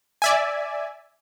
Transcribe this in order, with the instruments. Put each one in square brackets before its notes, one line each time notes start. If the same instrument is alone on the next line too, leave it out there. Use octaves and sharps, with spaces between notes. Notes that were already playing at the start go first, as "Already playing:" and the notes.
[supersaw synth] D5 E5 G#5